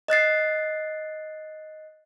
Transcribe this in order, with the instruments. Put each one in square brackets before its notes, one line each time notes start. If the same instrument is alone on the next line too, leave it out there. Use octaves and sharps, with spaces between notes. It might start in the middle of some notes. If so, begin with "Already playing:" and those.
[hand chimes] D#5 F#6 A6 C7